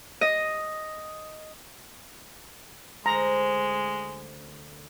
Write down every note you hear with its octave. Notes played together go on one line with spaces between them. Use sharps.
D#5
D2 G#3 C5 A#5